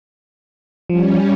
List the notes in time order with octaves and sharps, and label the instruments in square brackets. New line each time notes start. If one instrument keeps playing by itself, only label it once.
[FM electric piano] F3 [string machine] G3 C#4